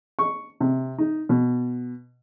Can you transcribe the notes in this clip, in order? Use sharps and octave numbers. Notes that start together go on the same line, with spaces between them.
C#6
C3
D#4
B2